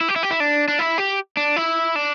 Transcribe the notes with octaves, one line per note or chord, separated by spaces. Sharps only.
E4
G4
E4
G4
E4
D4
D4
E4
G4
D4
E4
D4